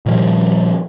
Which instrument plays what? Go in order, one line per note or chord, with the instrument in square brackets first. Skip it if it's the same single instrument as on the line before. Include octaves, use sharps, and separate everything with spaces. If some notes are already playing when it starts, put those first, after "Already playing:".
[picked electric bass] A#2 D#3 F3 G3